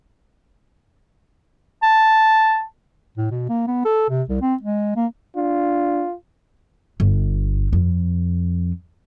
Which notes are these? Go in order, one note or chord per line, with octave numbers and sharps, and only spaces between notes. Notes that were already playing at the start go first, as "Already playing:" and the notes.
A5
A2
B2
A#3
B3
A4
C3
C2
C4
G#3
A#3
D4 F4
G1
F2